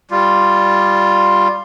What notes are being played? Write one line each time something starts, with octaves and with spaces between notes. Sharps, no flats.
G3 F4